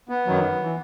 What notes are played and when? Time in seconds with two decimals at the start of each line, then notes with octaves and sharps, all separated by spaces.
0.09 B3
0.27 F#2 D#3 F#3
0.63 E3